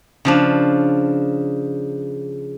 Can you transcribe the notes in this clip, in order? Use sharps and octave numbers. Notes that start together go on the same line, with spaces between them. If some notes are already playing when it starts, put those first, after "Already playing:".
C#3 F3 D4